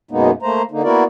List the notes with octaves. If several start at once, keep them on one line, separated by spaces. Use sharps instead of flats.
F#2 B2 G#3 A#3 B3 D#4
A3 A#3 C5 A#5
D3 A#3 D#4
A#3 B3 E4 F#4 A#4 D5